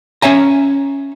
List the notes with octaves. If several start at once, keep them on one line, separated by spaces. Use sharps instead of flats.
C#4 C#5 E5 G#5 A#5